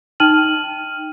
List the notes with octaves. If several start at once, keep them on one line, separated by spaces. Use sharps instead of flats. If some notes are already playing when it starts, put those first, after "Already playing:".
D#4 G5 F6 D#7 F#7